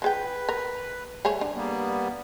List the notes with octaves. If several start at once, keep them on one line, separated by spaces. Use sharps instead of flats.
F3 G#4 B4 G5
A#4
G3 A3 G#4 C#5
D4
G3 A#3 B3